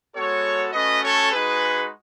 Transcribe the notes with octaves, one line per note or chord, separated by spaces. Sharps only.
G#3 B3 F#4 A4 C#5
A3 C#4 F#4 B4 D#5
A4 C#5
G#3 D#4 F#4 G#4 B4